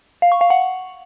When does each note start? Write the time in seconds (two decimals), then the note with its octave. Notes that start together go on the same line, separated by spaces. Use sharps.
0.22 F5
0.32 C#6
0.41 F5
0.50 F#5